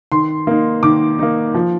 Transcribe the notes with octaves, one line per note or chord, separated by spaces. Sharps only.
D#3 C6
A#3 D#4
D#3 D6
A#3 D#4
F3